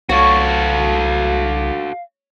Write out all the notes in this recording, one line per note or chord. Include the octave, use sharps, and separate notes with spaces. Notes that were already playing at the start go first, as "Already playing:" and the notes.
C2 F#4 A4 C#5 F5